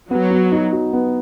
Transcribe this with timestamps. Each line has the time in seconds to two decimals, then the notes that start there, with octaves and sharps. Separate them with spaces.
0.11 F#3 B3
0.31 B3
0.52 D#4
0.72 F#4
0.93 B3